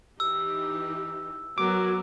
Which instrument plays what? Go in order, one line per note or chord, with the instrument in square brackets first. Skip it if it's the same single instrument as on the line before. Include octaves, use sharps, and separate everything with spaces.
[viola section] E3 D#4 G4 [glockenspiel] E6
[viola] F#3 [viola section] B3 F#4 A#4 [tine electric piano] D6